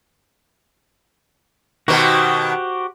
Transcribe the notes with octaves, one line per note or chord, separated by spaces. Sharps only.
B2 D#3 F#4 G4 C5